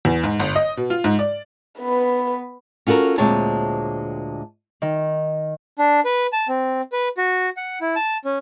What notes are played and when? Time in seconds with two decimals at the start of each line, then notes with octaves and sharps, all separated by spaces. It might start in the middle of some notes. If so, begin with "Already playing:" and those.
0.05 E2
0.23 G#2
0.40 G1
0.55 D#5
0.77 B2
0.90 F4
1.04 G#2
1.19 D5
1.79 B3 B4
2.87 C#4 F4 F#4 A4 A#4
3.18 D2 A#2 G#3 C4 C#5 A5
4.82 D#3
5.79 D4
6.05 B4
6.33 A5
6.48 C4
6.92 B4
7.17 F#4
7.57 F#5
7.81 E4
7.96 A5
8.25 C#4